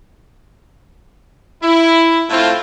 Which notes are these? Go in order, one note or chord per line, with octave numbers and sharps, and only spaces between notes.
E4
A2 A3 C4 E4 F4